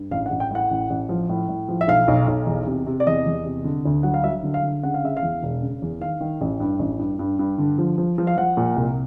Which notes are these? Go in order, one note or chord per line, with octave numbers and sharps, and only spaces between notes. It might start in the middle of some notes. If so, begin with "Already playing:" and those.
Already playing: G2
A1 F5
F#5
A1
G5
A2 F#5
A1
A1
F3
A2
A2
F3
E5
B1 F5
B1
B1
E2
C3
C3
D5
E2 D#5
E2
C3
D3
D2
F#3 F#5
F5
F#3 E5
D3
F5
D3
C#3 F#5
F5
C#3 E5
F5
E2
E1
C#3
E2
D#3 F5
D#3
A1
G2
A1
G2
G2
G2
D3
F3
F3
F3
F5
F3 F#5
A#2
C2